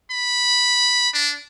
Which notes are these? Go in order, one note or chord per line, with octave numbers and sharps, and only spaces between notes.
B5
D4